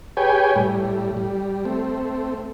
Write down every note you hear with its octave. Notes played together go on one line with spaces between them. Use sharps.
G4 G#4 B4 C#5 G5 G#5
A2 G3
G3
A3 C4